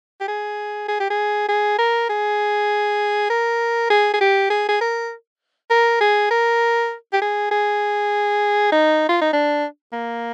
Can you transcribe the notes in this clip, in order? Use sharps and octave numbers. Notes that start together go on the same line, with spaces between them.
G4
G#4
G#4
G4
G#4
G#4
A#4
G#4
A#4
G#4
G#4
G4
G#4
G#4
A#4
A#4
G#4
A#4
G4
G#4
G#4
D#4
F4
D#4
D4
A#3